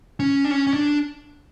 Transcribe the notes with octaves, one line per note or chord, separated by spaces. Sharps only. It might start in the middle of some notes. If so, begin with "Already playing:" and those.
C#4
D4
C#4
C#4
D4